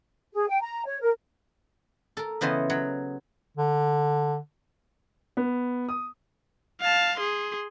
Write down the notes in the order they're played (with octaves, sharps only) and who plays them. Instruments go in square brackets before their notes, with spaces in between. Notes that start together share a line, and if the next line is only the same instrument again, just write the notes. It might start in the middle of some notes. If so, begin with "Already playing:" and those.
[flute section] G#4
G5
A#5
C#5
A#4
[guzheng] A4 A#4
C#3 E3 B3 C5 D#5
F#3
[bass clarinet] D3
[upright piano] B3
D#6
[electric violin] F5 A5
G#4 C6